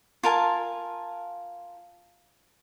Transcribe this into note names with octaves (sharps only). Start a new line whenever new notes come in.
F4 A#4 G#5 A5